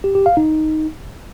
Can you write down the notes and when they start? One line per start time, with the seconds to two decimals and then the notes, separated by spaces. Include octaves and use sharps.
0.04 G4
0.15 G4
0.26 F5
0.37 D#4